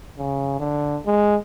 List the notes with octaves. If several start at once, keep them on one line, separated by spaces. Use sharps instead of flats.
C#3
D3
G#3